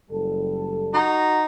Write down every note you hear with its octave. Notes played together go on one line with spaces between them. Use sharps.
F#1 G3 A4
D#4 F#4 A#5